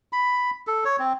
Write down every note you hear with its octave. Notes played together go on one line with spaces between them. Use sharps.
B5
A4
C#5
C4